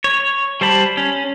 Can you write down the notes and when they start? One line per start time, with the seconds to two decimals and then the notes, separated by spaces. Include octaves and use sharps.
0.04 C#5
0.61 G3 C5 A5 B5
0.97 C#4